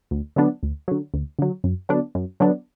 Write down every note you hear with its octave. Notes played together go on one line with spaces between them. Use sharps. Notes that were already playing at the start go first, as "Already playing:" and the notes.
D2
D3 F#3 B3 D4
D2
D3 F#3
D2
D3 F#3
F#2
D3 F#3 B3 D4
F#2
D3 F#3 B3 D4